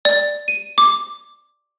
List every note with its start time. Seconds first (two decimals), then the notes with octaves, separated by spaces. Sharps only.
0.05 D5
0.48 D#7
0.78 D6